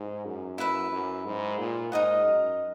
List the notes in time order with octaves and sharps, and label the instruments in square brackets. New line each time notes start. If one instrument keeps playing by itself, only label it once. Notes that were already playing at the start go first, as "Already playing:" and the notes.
Already playing: [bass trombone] G#2
F#2
[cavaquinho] E4 B4 E5
[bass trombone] F#2
G#2
A#2
[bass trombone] G#2 [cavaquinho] D#4 A#4 D#5 F#5
[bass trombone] F#2